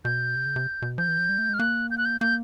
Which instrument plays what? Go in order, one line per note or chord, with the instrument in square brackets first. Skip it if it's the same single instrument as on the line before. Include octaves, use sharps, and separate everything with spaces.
[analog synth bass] B2 [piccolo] G6
[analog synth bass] C3
C#3
C3
B2
[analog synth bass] F3 [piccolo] G6
[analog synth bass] E3
F3
G3
A3
[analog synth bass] G#3 [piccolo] F6
[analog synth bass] A#3 [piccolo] F#6
[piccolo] G6
F#6
G6
[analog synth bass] A#3 [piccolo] G6